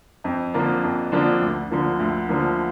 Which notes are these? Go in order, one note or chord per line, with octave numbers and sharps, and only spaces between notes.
F2
D3 F3 A#3 D4
F2
D3 F3 A#3 D4
D2
D3 F3 A#3
D2
D3 F3 A#3